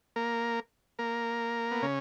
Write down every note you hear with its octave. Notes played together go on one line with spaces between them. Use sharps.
A#3 A#4
A#3 A#4
B3
C#3 C#4